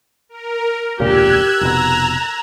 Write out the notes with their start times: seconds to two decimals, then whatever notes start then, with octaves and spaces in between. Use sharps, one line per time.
0.29 A#4
1.00 E1 C#2 A#2 G4 E6 F#6 G#6
1.61 F1 B2 A#5